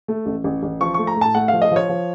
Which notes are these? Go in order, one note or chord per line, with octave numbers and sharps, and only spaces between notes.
A3
A1
A1
A1
F3 C#6
A3 C#6
A#5
A2
A5
A3 F#5
F3 F5
D#5
F3 C#5
F3